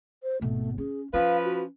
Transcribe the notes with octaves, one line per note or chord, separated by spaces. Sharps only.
C5
G#1 B2 A3
C#4 G#4
F3 C#4 B4 F5
F#4